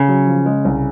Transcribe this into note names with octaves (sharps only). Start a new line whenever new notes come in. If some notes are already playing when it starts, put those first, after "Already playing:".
Already playing: C#3
F#3
F3
G#3
C2